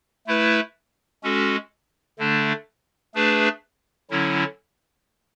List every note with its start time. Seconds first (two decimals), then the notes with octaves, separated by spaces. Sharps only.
0.27 A3 E4 B4
1.23 G#3 C#4 F#4 A4
2.19 D3 A3 D4
3.15 A3 D4 G#4 B4
4.10 D3 F#3 C#4 E4